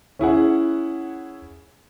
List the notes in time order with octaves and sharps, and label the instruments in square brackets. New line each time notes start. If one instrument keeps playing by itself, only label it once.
[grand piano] C#4 E4 G#4 F#5